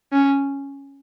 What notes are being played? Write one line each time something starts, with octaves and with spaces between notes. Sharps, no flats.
C#4